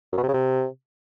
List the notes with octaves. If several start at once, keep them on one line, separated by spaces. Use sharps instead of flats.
F#2
B2
C3
C#3
C3